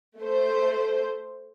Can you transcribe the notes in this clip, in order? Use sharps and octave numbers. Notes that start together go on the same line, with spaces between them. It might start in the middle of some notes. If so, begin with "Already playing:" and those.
A3 C5